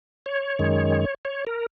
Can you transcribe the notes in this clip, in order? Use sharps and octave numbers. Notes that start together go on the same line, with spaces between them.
C#5
F#2 D#3 G#3
C#5
A#4